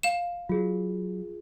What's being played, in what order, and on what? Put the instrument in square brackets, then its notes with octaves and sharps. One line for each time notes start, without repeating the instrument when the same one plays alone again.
[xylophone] F5 E7
[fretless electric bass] F#3 [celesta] F4 G#4